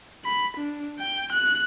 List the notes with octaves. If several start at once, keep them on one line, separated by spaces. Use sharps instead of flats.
B5
D4
G5
F#6